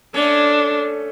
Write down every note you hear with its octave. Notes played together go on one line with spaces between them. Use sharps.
A3 C#4 D4